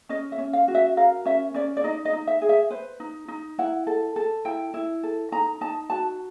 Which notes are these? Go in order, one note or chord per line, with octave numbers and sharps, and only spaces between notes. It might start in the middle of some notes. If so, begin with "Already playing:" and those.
C#4 D#5
E5
C#4
F5
F#4
E5
A#4 F5
C#4 E5
C#4 D5
D5
D#4 D#5
D#5
D#4
E5
G#4
E5
B4 C5
D#4
D#4
E4 F#5
A4
A4
E4 G5
E4
A4
D#4 A#5
D#4 A5
F#4 A5